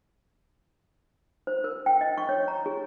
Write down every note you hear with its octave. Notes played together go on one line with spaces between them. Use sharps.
C5
A#4
G5
D#5
C#6
C#5
A#5
G#4